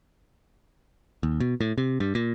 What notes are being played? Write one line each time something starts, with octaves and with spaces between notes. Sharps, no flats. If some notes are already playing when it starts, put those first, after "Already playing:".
D#2
B2
A2
C3
G2
A#2